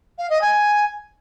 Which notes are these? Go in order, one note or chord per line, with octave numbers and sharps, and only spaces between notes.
F5
D#5
G#5